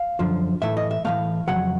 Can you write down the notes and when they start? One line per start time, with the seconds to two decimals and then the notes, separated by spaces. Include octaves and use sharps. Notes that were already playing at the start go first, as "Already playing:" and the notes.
Already playing: F5
0.19 F#2 D3 F3
0.62 A2 E3 A3 E5
0.77 D#5
0.91 E5
1.05 A2 E3 A3 F5
1.47 F2 C#3 F#3 F#5